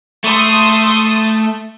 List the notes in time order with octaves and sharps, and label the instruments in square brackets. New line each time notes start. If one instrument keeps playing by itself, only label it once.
[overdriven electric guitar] A3 [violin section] C6 D#6